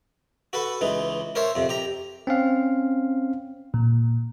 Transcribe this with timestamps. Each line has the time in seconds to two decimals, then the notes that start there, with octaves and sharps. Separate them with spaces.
0.53 F#4 A4 B4 F#5
0.81 C#2 E3 D#4
1.35 A#4 C5 C#5 E5 A5
1.56 F2 C3
1.69 G4 A#5
2.27 C4 C#4 F5
3.74 A#2